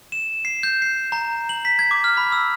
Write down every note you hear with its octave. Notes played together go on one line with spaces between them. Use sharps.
E7
C7
G6
C7
A#5
F#7
B6
G#6
D6
F6
B5
E6